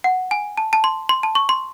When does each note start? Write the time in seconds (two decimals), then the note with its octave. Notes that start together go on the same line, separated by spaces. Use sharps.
0.04 F#5
0.31 G#5
0.57 A5
0.73 A5
0.84 C6
1.09 C6
1.23 A5
1.35 C#6
1.49 C6